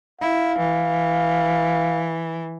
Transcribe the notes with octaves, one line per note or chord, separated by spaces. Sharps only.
E4 F5
E3